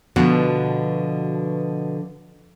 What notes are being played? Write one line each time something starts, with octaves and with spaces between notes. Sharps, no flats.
B2 D3 F3 D4